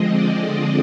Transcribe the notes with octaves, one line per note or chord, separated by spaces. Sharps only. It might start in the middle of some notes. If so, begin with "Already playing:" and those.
Already playing: D3 F3 G#3 C4 D#5
D5